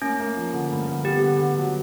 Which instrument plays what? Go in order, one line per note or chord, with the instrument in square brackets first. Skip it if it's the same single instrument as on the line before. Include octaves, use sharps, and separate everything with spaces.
[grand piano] A#3 [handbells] C#4
[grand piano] A#3
F3
D3
G2
D3
[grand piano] B3 [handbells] G4
[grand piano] D3
D3
F#3